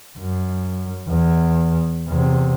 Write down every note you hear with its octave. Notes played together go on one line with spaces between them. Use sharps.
F#2
E2
E2 C3